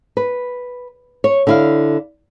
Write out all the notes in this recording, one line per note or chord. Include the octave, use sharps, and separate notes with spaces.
B4
C#5
D3 E4 F5